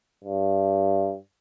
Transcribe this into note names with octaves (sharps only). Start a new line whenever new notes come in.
G2